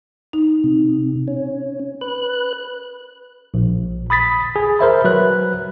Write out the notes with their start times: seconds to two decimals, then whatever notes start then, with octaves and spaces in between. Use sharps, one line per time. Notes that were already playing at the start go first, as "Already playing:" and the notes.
0.33 D#4
0.64 C3
1.28 C#4
2.01 B4 F#6
3.54 A#1
4.10 B5 D#6 A6 B6
4.56 G#4
4.79 A#4 C5 E5 B5
5.04 F#3 B4 F#6